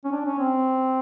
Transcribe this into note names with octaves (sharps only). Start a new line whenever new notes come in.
C#4
D4
C#4
C4